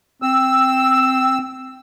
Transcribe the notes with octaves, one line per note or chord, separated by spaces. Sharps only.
C4 E6